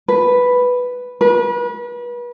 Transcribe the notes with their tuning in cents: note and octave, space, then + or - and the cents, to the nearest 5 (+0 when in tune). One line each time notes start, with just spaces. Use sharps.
B4 +0
B4 -35